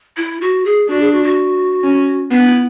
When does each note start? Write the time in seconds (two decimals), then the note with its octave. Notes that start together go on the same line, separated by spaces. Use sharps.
0.17 E4
0.41 F#4
0.65 G#4
0.89 D4 F#4
1.00 G#4
1.12 F#4
1.24 F#4
1.83 C#4
2.31 B3 D4
2.46 E4